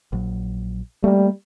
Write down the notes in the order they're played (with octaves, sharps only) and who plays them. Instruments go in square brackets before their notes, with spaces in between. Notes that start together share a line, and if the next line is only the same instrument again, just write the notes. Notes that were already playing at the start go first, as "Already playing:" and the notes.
[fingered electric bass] A#1 F#3
[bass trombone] G3 [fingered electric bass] A3 A#3